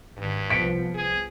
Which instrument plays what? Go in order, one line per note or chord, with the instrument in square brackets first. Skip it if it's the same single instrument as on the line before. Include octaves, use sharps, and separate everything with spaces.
[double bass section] G#1 D#3 [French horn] G2
[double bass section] C2 F3 B3 [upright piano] B6 C#7 D7
[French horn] G#4